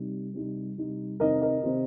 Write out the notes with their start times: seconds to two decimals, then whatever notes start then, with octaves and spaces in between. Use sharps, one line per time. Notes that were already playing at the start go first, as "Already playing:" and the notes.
Already playing: C3 G3 D#4
0.34 C3 G3 D#4
0.78 C3 G3 D#4
1.20 C3 D#3 C4 D#4 A#4 D#5
1.42 A#4 D#5
1.63 C3 D#3 C4 D#4